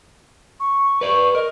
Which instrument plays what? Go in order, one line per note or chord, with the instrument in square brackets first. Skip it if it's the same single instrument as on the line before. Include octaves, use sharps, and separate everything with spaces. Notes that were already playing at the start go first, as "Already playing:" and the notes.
[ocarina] C#6
[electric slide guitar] B4 D5
[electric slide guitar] A#4 [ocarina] D#5